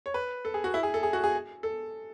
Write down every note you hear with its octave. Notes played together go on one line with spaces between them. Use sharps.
C#5
B4
A4
G#4
F#4
E4
G#4
A4
G#4
F#4
G#4
A4